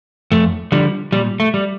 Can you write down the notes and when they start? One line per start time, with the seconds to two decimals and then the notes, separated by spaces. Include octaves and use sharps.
0.32 F2 A3
0.72 D3 F3 G3
1.12 A#2 G3
1.40 A3
1.54 G3